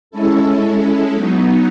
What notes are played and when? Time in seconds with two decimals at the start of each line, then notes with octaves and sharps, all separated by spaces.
0.11 G#3 C#4 E4 A4
1.15 F#3 B3 D#4